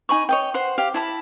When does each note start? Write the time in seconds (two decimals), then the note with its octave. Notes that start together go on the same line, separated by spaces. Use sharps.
0.09 D#4 G#5 B5 C#6
0.29 C#5 D#5 G5
0.54 C5 F#5 C6
0.78 G4 F5
0.94 E4 A5 B5